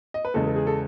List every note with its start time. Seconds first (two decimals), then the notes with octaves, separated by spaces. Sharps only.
0.14 D#5
0.25 B4
0.34 E2 C#3 G#3 A4
0.47 A4
0.56 G#4
0.67 A4